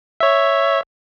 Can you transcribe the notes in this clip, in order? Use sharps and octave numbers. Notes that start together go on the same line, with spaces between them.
C#5 E5